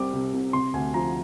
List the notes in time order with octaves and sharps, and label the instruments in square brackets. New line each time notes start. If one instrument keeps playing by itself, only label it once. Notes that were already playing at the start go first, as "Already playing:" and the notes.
Already playing: [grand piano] C2 C3 G3 C4 G5 D6
C3
C2
C3 C6
D2 G#5
F3 A#5